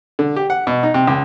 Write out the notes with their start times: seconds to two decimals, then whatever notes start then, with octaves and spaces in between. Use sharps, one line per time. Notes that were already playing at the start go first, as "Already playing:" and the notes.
0.19 D3
0.36 G4
0.50 F#5
0.67 B2
0.83 D#4
0.94 C3
1.07 C#2